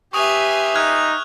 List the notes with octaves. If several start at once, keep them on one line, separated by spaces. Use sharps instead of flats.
G4 B4 E5 G#5 C6 C#6 D#6 F7
D#4 F6 F#6 G#6